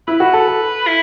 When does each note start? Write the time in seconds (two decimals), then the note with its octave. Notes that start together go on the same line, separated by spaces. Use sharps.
0.07 E4 B4
0.20 F#4
0.33 A4
0.48 A4
0.87 E4